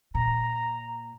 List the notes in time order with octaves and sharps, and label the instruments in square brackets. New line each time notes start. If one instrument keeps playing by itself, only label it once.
[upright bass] A#2 [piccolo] A#5